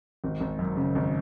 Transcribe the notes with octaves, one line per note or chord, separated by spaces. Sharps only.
G#1
G#1
F#2
C#3
G#1